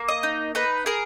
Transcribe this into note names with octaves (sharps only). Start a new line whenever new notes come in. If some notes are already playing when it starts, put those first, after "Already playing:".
Already playing: A#3
D#5
D#4
D#4 B4
G#4 A#4